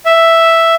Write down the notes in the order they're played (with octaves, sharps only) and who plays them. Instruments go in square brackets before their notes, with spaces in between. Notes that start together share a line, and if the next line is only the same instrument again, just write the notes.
[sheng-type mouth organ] E5